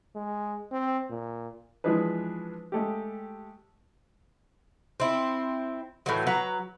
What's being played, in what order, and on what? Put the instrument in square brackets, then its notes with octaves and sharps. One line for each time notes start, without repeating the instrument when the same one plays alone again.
[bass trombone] G#3
C4
A#2
[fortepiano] E3 F3 G#3 D4 G#4 B4
G#3 A3 G4
[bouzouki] C4 E4
A2 E3 F#3
F#3 B4 A#5